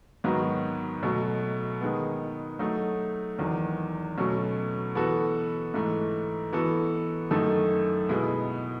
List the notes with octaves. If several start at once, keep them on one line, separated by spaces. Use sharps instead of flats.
G#2 D#3 F#3 B3 F#4
B2 F#3 A3
D#3 G#3 B3
F#3 A3 D#4
E2 D#3 F#3
B2 F#3 A3 C#4
E3 B3 F#4 A4
G#2 E3 A3
E3 B3 F#4 A4
F#2 D#3 A3 D#4 A4
B2 G#3 B3 E4